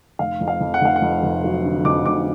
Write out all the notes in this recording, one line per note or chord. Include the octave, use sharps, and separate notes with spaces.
F1 F5
F2
F5
F2
F#5
F1 F5
F#5
F2
F1
F#3
D3
F2 D6
F1 D6